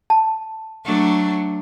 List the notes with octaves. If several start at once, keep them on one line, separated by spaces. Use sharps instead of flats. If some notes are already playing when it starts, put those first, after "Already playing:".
A5
F#3 A3 D4